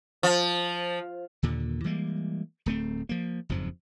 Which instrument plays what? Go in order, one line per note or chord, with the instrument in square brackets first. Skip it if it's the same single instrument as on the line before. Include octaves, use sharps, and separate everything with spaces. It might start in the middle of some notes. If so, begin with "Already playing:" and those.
[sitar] F3
[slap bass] D#2 A#2 D3
E3 G3 G#3 A#3
D1 A3 C4
F3 A#3
F#1 F2 G#2 F3